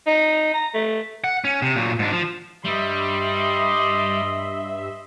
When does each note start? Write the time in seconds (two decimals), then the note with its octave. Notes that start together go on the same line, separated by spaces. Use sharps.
0.07 D#4
0.53 A#5
0.74 A3
1.24 F#5
1.44 C#4
1.62 C3
1.76 A#2 F#3
1.99 G#2 D4
2.13 F3
2.64 G2 G3 D#5 E5 B5 C6